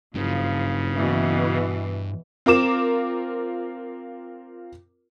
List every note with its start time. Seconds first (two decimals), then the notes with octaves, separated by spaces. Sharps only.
0.15 F#1 G2 C#3 F3
0.94 B2 E3
2.46 C4 F4 A#4 D6 E7